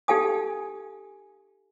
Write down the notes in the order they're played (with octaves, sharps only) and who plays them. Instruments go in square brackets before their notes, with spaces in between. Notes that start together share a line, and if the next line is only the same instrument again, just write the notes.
[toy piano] D#4 G4 A4 F5 G#5 D#6